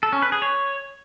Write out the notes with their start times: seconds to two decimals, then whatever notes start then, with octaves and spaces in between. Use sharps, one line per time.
0.03 A4
0.13 C#4
0.22 B4
0.32 G#4
0.42 C#5